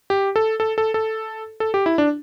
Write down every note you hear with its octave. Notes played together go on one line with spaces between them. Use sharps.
G4
A4
A4
A4
A4
A4
G4
E4
D4